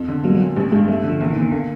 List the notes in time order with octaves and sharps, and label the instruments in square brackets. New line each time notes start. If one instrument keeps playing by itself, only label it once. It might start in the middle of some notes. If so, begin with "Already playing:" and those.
Already playing: [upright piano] F2
D3
[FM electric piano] F#3 [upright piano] A#3
[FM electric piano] G3
F#3
[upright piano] A#2
[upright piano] A1 [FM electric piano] G3
[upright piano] G2 [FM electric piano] G#3
[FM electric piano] G3 [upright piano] A3
[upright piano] D3
[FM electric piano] F3
[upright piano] A#1 [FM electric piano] E3
[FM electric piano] D#3
[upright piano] A#2
[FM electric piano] D#3
[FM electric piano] D3 [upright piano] A#3